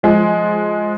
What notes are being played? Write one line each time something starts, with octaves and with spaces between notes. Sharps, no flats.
F3 G#3